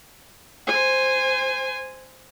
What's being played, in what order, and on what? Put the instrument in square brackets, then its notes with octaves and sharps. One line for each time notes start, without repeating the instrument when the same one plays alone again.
[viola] C5 G#5